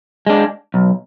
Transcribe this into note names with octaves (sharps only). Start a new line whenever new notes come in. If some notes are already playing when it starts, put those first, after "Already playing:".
G#3 D4
B1